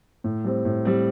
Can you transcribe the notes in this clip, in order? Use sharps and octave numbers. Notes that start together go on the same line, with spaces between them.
A2
G3 C4
A2
G3 C4